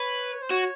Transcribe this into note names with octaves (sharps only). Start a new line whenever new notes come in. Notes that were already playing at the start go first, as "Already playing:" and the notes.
Already playing: B4 C#5
C5
F#4 C#5